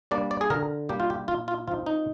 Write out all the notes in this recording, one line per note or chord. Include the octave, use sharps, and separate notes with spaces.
G3 A#3 D4 D5
D5
G#4
D3 A#4
G3 A#3 D4 G4
F4
G4
A#2 F4
F4
F3 C4 D#4 F4
D#4